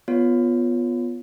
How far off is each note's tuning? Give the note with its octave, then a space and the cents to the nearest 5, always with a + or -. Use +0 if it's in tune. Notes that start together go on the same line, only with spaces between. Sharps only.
B3 +0 F4 +0 C#5 +0